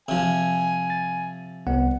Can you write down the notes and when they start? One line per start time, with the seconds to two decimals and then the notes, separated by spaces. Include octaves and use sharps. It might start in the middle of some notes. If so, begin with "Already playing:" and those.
0.08 C3 F3 G#5
0.90 A6
1.67 C2 B3 F#5